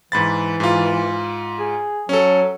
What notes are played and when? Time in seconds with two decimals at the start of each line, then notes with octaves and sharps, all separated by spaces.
0.12 G#2 E3 B5 A6
0.60 G#2 F4
1.59 G#4
2.09 F#3 C#4 A4